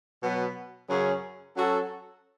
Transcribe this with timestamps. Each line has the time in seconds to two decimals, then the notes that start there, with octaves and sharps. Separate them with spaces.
0.22 B2 F#3 B3
0.89 F#2 C#3 F#3 C#4 G#4
1.55 F#3 C#4 F#4 A4